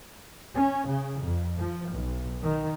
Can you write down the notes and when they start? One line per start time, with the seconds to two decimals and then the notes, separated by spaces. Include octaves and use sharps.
0.54 C#4
0.88 C#3
1.19 F2
1.59 F3
1.91 B1
2.43 D#3